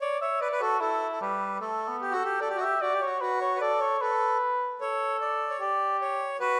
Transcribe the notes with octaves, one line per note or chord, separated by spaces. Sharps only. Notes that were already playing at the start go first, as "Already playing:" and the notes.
C#5 D5
C#5 E5
B4 D5
B4
F#4 A4
E4 A4
A4
G3 B4
A3 A4
B3
G4
F#4 A4
G4
A4 D5
G4
F#4
G4 E5
F#4 D5
G4
F#4 C#5
F#4 B4
C#5
B4
A4 D5
C#5
A4 B4
A4 C#5
D5
C#5
G4 D5
C#5
F#4 B4